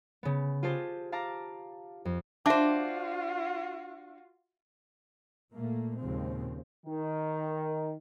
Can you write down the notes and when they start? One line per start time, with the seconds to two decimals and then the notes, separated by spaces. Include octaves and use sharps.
0.23 C#3 B3
0.63 F4 G4 G#4 C5 A5
1.12 F5 A5 A#5 D6
2.05 F2
2.46 D4 F4 F#4 C5 E5 A5 D6
5.53 A#2 A3 A#3
5.98 D#2 A#2 C#3 F3 G#3 C4
6.86 D#3